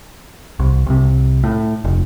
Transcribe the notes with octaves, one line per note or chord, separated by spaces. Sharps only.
C2
C2 C3
A2
F1